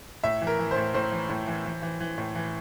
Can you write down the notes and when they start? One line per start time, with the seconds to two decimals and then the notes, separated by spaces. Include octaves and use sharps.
0.23 A2 E5
0.42 E3
0.47 A#4
0.59 E3
0.71 C5
0.76 A2
0.94 A2 C5
1.12 E3
1.29 A2
1.47 E3
1.66 E3
1.83 E3
2.00 E3
2.18 A2
2.36 E3